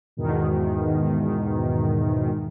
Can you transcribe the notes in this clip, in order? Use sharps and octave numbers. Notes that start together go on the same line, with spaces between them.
E2 G#2 B2 D#3